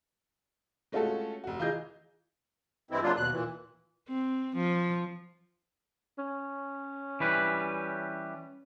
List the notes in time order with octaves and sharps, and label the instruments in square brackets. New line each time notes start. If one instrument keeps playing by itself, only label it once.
[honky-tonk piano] G#3 A3 C#4 F4 F#4 A4
F1 F#4
E3 F4 G#4 D#5 G6
[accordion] G2 E3 G#3 C4 E4
C#3 F#3 A#3 D4 F4
D#2 B2 F#6
A#2 E3
[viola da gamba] C4
F3
[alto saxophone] C#4
[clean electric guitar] E3 G3 B4